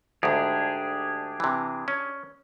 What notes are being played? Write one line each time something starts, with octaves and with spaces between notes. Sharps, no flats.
D2 G#2 D4 G4 G#4
C3 E3
C#4